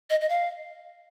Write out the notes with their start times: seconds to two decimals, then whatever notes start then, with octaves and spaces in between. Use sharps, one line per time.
0.10 D#5
0.21 D#5
0.29 F5